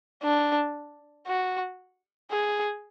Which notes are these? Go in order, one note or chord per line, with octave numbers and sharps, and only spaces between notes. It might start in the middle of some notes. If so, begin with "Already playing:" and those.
D4
F#4
G#4